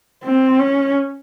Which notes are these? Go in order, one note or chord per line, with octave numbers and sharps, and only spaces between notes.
C4
C#4